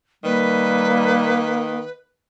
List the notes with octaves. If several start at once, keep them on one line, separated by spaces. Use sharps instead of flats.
D#3 G3 A#3 B4